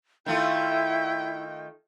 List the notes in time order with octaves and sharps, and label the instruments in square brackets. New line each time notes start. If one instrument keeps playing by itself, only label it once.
[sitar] D#3 A3 F4 [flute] E4 [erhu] G5